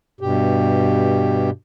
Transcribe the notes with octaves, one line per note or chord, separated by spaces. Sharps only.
G2 B2 G4